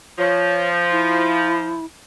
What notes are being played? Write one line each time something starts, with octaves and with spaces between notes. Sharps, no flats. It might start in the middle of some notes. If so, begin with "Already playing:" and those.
F3 C#5
E4